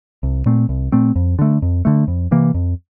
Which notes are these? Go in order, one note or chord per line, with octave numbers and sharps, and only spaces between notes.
C2
A#2 A3 C4
C2
A#2 A3 C4
F2
D3 A3
F2
D3 A3
F2
C3 E3 A#3
F2